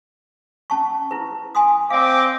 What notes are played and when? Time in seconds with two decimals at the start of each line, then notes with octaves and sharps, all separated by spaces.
0.70 C#4 A5 C#6
1.11 E4 B4
1.55 G#5 C6 D#6
1.90 C4 D5 D#5 F5 D6